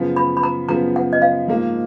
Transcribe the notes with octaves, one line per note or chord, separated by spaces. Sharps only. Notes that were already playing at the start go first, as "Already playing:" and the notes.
Already playing: F#2 C#3 F3 B3
B5
B5
A#5
F#2 C#3 F3 B3 A#5
F#5
D#5
F5
G#2 F3 A#3